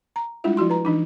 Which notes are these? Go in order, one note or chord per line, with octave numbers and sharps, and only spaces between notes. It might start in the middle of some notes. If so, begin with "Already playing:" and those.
A#5
G3 G#3 D4 E4 F4 E5
F3 E4 F#4 C6
B4 A#5
E3 D4 D#4